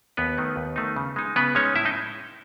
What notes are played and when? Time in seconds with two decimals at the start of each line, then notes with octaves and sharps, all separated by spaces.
0.17 D#2 B3 B4
0.38 D#3 A3 D#4
0.56 D#2
0.76 D#3 A3 D#4
0.96 C#3
1.16 G#3 D#4
1.36 C#3 B3 B4
1.55 G#3 C#4 D#4 C#5
1.75 A2 E4 E5
1.85 D#4 D#5